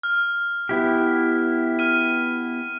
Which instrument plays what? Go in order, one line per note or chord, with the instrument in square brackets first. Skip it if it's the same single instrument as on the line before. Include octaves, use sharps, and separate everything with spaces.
[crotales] F6
[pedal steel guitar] B3 E4 G4
[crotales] F6 D#7